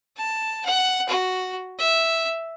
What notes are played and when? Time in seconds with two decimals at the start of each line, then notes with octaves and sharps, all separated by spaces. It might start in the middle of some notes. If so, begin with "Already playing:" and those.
0.17 A5
0.65 F#5
1.09 F#4
1.79 E5